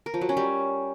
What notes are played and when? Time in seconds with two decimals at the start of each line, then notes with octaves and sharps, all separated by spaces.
0.06 A#4
0.14 F3
0.21 F#3
0.29 C#4
0.37 G3